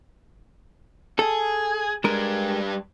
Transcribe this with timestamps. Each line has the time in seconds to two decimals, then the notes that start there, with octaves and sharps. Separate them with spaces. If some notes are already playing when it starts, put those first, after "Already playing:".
1.19 G#4 A4
2.04 G3 G#3 D4 G#4 A#4